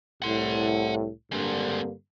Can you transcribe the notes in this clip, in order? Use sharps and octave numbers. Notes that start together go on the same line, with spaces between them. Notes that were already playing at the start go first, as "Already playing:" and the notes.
C2 A2 F#5 C6
G2 D3 G#3 A#3 C4